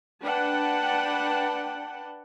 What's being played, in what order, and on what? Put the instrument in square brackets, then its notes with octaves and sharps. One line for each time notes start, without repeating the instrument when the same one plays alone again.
[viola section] D4 B4 F#5 G5 A5